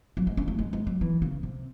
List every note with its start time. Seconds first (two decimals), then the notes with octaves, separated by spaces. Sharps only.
0.17 F#3
0.27 G#3
0.37 C#4
0.48 A3
0.59 G#3
0.73 G#3
0.87 F#3
1.01 E3
1.22 C#3
1.43 C3